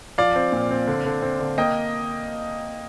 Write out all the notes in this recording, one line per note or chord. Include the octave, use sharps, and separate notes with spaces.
F3 D5 F5
C4
A#2
C4
D3
D3
C4
D3
A#3 D#5 G5